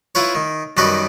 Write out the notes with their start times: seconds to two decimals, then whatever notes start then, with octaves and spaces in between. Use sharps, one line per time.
0.15 E4 F4 B4 C#5
0.35 D#3
0.77 F#2 D#3 G3 F#4 B4 D#5